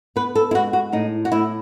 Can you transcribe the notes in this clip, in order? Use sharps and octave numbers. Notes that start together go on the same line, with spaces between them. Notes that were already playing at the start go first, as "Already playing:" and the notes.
B3 B4
A4
E4
G#3 F#4
F#4
A2 D#4
F#4
A2 E4